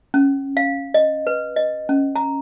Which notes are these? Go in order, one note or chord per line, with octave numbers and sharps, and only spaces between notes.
C#4
F5
D#5
B4
D#5
C#4
A#5